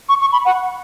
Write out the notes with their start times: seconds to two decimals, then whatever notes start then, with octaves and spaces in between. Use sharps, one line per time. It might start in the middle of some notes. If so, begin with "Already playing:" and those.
0.09 C#6
0.21 C#6
0.32 B5
0.45 F#5